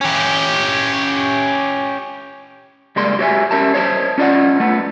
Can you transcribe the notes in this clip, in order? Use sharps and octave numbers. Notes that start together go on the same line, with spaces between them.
C#4 G4
C#2 G3 G#3 A#3 D5 C6
F#4 G4 C#5 D5 E5 G#5
C#4 G4 A#4 E5 A5
C5 C#5 D#5 G5 A5
C#4 F4 D5 D#5 F#5
A3 B3